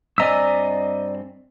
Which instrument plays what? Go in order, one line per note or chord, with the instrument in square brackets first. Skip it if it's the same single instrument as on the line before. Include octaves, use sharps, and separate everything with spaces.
[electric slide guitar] G2 C4 G#5 [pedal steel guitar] D5 A#5 E6 [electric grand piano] D#5 B6